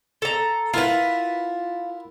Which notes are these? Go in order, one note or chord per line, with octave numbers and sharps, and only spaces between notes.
A4 A#5
E4 F4 A#4 B4 F#5